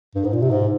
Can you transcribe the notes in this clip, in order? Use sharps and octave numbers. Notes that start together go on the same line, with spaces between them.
G2
G#2
A#2
C3
G#2